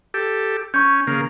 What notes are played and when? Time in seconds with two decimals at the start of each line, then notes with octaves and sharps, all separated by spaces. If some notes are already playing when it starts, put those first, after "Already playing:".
0.14 G4 A4
0.74 C#4 C#6 G6
1.07 C#3 A#3